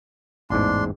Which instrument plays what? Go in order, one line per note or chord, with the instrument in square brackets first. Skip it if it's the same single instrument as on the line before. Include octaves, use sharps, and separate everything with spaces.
[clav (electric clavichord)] A1 E2 G#2 [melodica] D4 C6